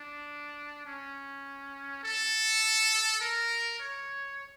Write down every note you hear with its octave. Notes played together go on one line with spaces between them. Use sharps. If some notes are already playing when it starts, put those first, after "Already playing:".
Already playing: D4
C#4
A4
A#4
C#5